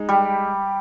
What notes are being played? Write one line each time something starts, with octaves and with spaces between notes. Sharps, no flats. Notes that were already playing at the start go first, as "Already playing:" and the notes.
Already playing: G#3 D#4
G3